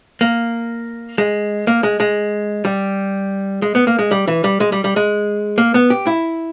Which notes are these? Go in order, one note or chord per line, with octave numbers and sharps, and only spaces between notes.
A#3
G#3
A#3
G#3
G#3
G3
G#3
B3
A#3
G#3
G3
E3
G3
G#3
G3
G3
G#3
A#3
B3
G4
E4